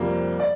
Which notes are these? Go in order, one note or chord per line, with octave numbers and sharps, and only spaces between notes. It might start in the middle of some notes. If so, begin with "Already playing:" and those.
Already playing: F2 C3 G3 A#3
D5